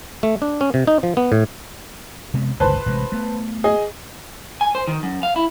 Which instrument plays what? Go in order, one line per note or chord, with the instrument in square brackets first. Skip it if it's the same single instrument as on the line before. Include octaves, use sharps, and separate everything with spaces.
[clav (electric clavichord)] A3
D4
C#4
C3
D#4
F3
B3
A2
[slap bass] C3 G#3 B3
[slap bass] G1 C#2 [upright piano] B4 C5 A5
[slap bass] A1 C3 G#3
A3 B3
[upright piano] G#4 D#5
[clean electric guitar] G#5
C5
D#3
F#2
F5
E4